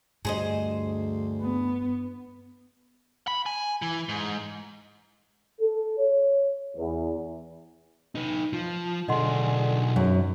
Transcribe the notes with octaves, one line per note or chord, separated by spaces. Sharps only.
D2 G2 G#4 C5 D#5
B3
B5
G#5
E3
G#2
A4
C#5
E2
D#4 B4
F3
B1 D3 G#4 D#5 F#5 C6
G#1 F#2